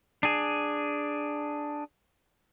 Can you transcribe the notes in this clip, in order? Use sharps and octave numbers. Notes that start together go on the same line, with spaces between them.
D4 G#4